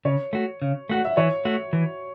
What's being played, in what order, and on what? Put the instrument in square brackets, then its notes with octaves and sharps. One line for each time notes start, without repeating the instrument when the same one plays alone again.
[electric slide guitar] C#3 [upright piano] C#5
[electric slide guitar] A3 F#4
C#3
[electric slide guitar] A3 F#4 [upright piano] F#5
[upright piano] E5
[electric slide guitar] E3 [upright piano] C#5
[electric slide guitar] A3 F#4
E3